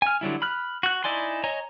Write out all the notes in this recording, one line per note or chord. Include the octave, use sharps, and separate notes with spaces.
G#5 F6
D3 F#3 G3 E4
B5 F6 F#6
F#4 F#6
D#4 E4 D5 G#5 C6
C#5 D#5 G#5 A#5